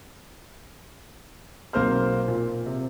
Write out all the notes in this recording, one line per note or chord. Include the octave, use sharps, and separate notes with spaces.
B1 A#3 C4 C5 F6
A#2
C3